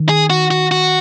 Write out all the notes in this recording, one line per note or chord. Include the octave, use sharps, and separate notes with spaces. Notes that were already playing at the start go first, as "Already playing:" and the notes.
Already playing: D#3
G#4
F#4
F#4
F#4